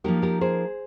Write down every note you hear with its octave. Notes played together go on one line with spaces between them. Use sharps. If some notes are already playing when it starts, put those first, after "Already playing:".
F3 A#3 D#4 G4 A#4
G4 A#4
G#4 C5